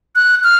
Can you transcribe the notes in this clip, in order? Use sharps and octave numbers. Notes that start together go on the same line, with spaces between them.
F#6
F6